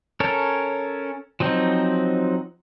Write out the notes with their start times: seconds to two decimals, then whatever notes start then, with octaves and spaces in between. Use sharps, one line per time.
0.20 C#4 A4 A#4 C#5
1.40 F3 F#3 C4 D#4